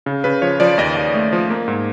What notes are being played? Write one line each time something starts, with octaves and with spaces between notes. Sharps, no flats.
C#3
C#3 B4
F3 C#5
F3 D5
D#2 D#5
D#2
A3
F3
A#3
G#2